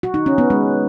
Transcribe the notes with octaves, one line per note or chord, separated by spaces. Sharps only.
F#4
D#4
C#4
B3
G#3